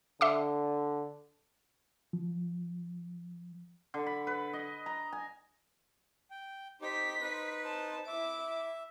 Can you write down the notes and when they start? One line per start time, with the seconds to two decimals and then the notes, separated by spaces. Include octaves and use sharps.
0.21 D3 E5 C6 D6
2.13 F3
3.94 D3
4.06 B5
4.27 B4
4.53 D#5
4.86 A#5
5.13 G#5
6.31 G5
6.82 D#4 G4 C5 B6
7.21 D#4 B4
7.62 C5 A5
8.07 E4 E5 D6